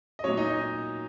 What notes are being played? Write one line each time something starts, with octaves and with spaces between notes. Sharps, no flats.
D#5
A#2 F#3 C#4 C#5
D#4 D#5
D#4 D#5